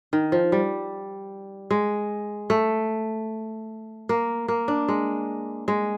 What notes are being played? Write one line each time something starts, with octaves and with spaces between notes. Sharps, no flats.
D#3
F3
G3
G#3
A3
A#3
A#3
D4
G#3
G#3